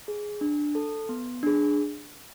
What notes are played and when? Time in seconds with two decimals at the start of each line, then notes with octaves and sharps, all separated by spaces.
0.08 G#4
0.41 D4
0.75 A4
1.09 B3
1.43 D4 G#4